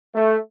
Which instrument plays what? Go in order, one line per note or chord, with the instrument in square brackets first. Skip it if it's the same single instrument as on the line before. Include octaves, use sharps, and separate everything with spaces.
[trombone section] A3